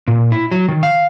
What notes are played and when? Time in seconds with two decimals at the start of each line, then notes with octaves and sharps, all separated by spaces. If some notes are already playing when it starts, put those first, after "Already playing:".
0.08 A#2
0.32 E4
0.51 F#3
0.68 D#3
0.83 F5